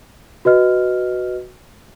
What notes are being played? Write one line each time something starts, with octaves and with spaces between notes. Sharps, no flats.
F#4 B4 D#5 F6